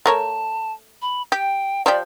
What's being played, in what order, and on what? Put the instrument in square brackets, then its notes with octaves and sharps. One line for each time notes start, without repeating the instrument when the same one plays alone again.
[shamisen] A3 A#4 C#5 [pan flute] A5
[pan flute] B5
[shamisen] G4 [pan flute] G5
[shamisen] F3 G4 [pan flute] D5